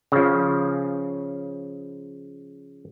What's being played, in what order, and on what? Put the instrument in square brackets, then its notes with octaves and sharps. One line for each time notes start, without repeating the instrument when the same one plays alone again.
[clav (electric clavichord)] C#3 F3